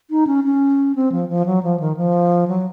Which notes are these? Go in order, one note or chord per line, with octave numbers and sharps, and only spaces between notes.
D#4
C#4
C#4
C4
F3
F3
F#3
F3
D#3
F3
F#3